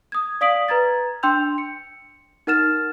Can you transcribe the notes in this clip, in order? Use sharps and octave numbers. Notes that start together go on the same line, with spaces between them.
D#6 G#6
D5 F5 D#6 B6 D7 F#7
B4 A#5 G#6 A6
D4 G5 C6 E6 G6 F7
C#7
D#4 A#4 F#5 F6 A6 E7